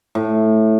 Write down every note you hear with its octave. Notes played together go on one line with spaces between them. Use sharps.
A2